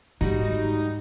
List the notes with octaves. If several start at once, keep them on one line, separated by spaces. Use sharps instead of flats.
G#2 G3 G#3 D#4 F#4